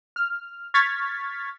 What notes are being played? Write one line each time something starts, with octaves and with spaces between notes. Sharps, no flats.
F6
C#6 F6 G#6 A6 B6